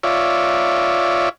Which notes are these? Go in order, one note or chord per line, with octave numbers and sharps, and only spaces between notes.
F4 C#5 D5 E5